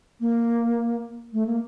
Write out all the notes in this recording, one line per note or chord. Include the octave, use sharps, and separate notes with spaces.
A#3
A3
A#3